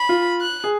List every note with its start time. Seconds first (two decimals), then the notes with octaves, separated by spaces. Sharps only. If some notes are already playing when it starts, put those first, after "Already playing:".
Already playing: B5
0.09 F4
0.41 F#6
0.64 G#4